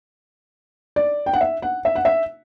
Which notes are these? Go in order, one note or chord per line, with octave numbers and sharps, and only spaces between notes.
D5
G5
F#5
E5
F#5
E5
F#5
E5